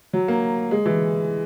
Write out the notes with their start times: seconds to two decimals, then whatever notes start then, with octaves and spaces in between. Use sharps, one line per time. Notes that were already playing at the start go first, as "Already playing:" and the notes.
0.13 F#3
0.28 A#3
0.71 G#3
0.86 E3